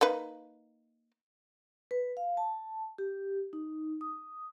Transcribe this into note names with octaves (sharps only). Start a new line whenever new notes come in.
A#3 D#4 B4
B4
F5
A5
G4
D#4
D#6